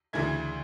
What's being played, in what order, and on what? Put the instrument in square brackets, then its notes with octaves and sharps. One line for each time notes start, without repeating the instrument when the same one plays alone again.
[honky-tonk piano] D2 C#3 E3 A3 G#6